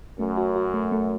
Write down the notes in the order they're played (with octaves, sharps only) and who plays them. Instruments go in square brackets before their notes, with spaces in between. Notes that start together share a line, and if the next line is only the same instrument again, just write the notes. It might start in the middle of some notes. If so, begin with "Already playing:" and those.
[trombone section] F#2 [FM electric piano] A3
[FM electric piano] F#4
F#4
A3
A3